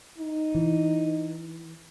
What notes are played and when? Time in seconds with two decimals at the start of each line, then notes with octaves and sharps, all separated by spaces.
0.18 D#4
0.55 E3